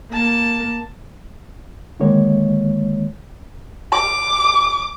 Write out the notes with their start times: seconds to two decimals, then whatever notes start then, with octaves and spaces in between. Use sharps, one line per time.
0.11 A#3 A5
2.00 D3 D#3 G#3 A#3 C#5
3.92 D6